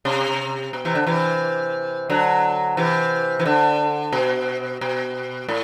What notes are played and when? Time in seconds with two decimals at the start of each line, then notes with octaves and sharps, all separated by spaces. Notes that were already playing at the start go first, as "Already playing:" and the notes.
0.05 C3
0.73 B2
0.85 C3 E3
0.95 D3
1.06 C3 E3
2.10 D3 F#3
2.77 C3 E3
3.39 E3
3.45 D3
4.12 B2
4.81 B2
5.48 A2